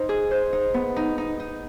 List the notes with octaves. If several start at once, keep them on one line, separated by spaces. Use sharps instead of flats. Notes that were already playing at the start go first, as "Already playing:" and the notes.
Already playing: D#4 C5
G#4
C5
D#4
B3
D#4
D#4
D#4